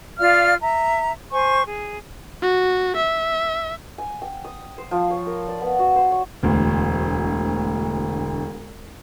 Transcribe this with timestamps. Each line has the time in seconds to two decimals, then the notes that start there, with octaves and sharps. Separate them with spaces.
0.19 F4 D5 F5 F6
0.61 E5 A#5
1.32 C5 G#5 C#6
1.66 G#4
2.42 F#4
2.96 E5
3.98 G#5
4.22 G5
4.44 D#6
4.78 C5
4.91 F3
5.10 C#5
5.27 A#4
5.48 D5
5.61 B3
5.79 F#4
5.96 C5
6.11 C#5
6.43 E1 D2